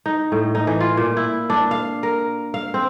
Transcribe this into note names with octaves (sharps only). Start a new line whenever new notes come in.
D#4
A2
D#4
E3
F4
A#2
E4
D4
F5
A#4
F5
C4